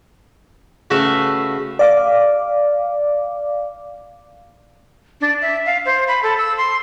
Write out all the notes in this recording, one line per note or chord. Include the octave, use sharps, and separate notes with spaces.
C#3 A3 F#4 B4 E5 F5
D5 F5 D6
D4
E5
F5
C5
B5
A4
E6
C6